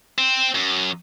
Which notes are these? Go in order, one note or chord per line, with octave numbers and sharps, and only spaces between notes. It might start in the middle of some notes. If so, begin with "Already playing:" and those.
C4
F#2